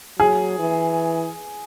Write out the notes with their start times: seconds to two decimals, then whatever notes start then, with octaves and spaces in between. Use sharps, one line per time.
0.19 F#3 G#4
0.59 E3